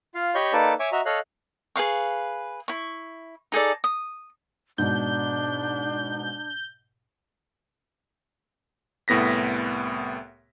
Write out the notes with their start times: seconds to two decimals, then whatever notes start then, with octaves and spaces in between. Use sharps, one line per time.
0.15 F4 F5
0.35 G4 C#5 D#5 B5 C#6 G6
0.53 A#3 D#4 A4 B4 D5 A5
0.80 C#5 E5 G#5 C#6 D6
0.92 F#4 D#5 E5 A#5
1.06 A4 C#5 D#5 F5 F#6
1.76 G#4 B4 F5 C#6
2.68 E4 C#6
3.52 D#4 G#4 A4 D5
3.84 D#6
4.78 G#2 B2 D4 G6
9.08 C2 A2 B3 A#6 B6